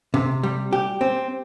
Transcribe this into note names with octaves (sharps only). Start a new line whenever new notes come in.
C3
G3
G4
C4